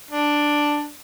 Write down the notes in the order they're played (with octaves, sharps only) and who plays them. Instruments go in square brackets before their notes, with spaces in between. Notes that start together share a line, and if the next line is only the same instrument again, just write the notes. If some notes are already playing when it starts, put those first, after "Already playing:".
[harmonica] D4